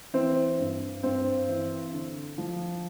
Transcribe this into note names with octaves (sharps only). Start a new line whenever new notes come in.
E3 C4
G2
G2 C4
E3
D3
F3